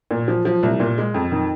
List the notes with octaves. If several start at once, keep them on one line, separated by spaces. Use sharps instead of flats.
A#2
F3
F3
C2
A#2
G#3
F2
D#3